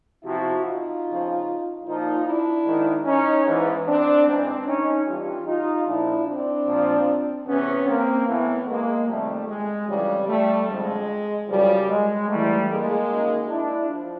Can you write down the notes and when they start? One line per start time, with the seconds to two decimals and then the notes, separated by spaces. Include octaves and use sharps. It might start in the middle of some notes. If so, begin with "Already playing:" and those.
0.25 E2 C3 F3 E4 F#4
0.64 D#4 F4
1.04 F2 C#3 F3
1.85 A#2 F3 D#4 F4
2.26 D4 E4
2.65 G#2 D#3
3.05 C#4 D#4
3.45 G#2 E3
3.86 C4 D4
4.26 G#2 E3 C4 D4
4.66 C#4 D#4
5.06 G2 E3 F4 G4
5.46 D#4 F4
5.86 A#2 F3 D4 E4
6.26 C4 D4
6.67 A#2 F3
7.47 E2 C3 E3 B3 C#4
7.87 A#3 C4
8.27 A2 E3 A3 B3
8.68 G#3 A#3
9.07 F2 C3 D#3 G3 A3
9.48 G#3
9.88 F2 C#3 E3 G3
10.28 G3 A3
10.68 F2 D3 F3 G#3
11.48 F#2 C#3 F3 G3
11.89 G#3
12.28 G#2 E3 G3 A3
12.68 G#3 A#3
13.09 F#2 D#3
13.49 D4 E4
13.89 F3